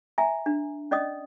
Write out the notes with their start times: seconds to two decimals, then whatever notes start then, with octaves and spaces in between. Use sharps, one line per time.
0.18 E5 G#5 A#5
0.46 D4
0.91 C#4 D5 D#5 D#6